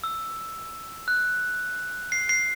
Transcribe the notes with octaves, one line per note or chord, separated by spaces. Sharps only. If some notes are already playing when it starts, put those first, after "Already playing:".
E6
F#6
C7
C7